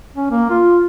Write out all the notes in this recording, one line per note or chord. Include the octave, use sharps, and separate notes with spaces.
C#4
A#3
F4